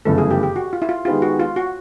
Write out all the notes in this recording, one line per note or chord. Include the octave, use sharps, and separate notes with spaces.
G1 F#2 C#3 E3 A3 A4
G#4
G4
G4
F#4
F4
E4
F4
D#3 G#3 B3 D#4 F4 G4
F#4
F4
F#4